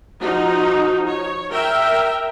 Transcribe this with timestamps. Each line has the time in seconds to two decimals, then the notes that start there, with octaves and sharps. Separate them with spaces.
0.21 F3 D#4 F#4
1.07 C#5
1.51 A#4 E5 G5